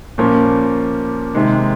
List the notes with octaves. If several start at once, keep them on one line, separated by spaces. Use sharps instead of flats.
A#2 F3 A#3 C#4
C3 D#3 G#3